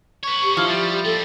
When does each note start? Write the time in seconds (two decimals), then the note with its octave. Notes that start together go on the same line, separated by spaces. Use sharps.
0.23 B4 C#5 C#6
0.43 G4
0.57 D3 F3 E4 A4 F6
0.69 G3 A6
1.05 G3 A#3 A4